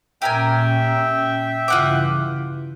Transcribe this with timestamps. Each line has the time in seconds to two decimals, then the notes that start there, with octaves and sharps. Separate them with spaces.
0.22 A#2 C#4 G4 A#4 E5 G5 G#5
1.68 G2 C#3 E3 F4 F#5 D6